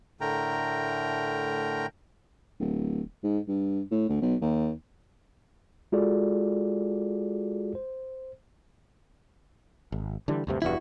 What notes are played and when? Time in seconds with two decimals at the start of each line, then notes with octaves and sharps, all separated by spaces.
0.21 A2 D3 A3 A#4 G5 A#5
2.59 D1
3.23 G#2
3.48 G2
3.91 A2
4.09 D2
4.22 B1
4.41 D#2
5.92 G#3 F4 F#4 G#4 A4 D5
7.75 C5
9.92 G#1
10.28 D3 E3 G3
10.47 D2 G2 C3
10.62 F1 E2 G2 E4 F#4